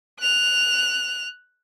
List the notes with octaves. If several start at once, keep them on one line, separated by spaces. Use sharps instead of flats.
F#6 F7